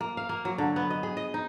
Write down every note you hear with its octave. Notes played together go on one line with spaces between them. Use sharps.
A#3
F5
A#3
F#3
D3
B3
D#5
G#4
D#5
D#4